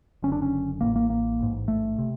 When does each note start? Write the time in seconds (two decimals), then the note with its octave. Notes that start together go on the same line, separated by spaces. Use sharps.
0.23 F#1 F#2 D3 C#4
0.32 D4
0.42 C#4
0.81 A1 A2 A#3
0.96 A#3
1.10 A#3
1.39 A1 G#2
1.68 A3
1.99 C3